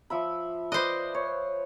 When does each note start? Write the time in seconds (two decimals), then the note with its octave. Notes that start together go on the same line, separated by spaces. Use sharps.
0.10 F3 E5 B5
0.72 B4 C5 D5 D#5
1.15 C#5